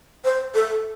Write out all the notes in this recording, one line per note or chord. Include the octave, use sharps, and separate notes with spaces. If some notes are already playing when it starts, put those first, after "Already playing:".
C5
A4